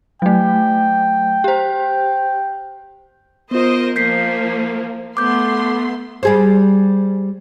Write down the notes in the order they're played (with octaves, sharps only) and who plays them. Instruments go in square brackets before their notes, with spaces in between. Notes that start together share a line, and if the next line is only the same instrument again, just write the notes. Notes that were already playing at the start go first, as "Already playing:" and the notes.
[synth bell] F#3 A3 [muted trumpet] G5
[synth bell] G4 C5
[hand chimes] B3 F4 [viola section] A#4 C5 D#5
[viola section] F3 A#3 [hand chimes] G6 B6 C7
[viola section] A3 B3 C6 [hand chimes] D6 G6
[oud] G3 G#4 C5